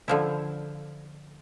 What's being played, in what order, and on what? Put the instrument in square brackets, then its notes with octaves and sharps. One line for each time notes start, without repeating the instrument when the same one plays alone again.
[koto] D3 F3 E4